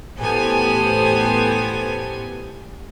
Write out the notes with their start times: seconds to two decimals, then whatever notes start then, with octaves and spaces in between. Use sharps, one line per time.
0.19 A1 B3 G4 A4 C5 G#5